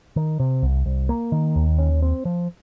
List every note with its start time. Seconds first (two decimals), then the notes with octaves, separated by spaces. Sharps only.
0.16 D#3
0.40 C3
0.62 C2
0.86 C2
1.09 A#3
1.32 D#3
1.56 D#2
1.78 C#4
2.02 C4
2.25 F3